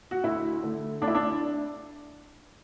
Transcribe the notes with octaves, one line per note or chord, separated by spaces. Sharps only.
F#4
D2 E4
D3 A3
D2 D4
E4
D4